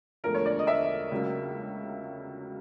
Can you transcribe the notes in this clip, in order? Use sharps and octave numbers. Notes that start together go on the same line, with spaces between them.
E1 D2 D3 F3 A#4
C#5
D5
D#5
E5
C#2 C#3 F#3 A#3